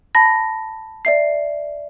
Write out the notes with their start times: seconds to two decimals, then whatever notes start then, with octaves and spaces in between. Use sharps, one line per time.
0.15 A5 B5 A#6
1.05 D5 E5 C7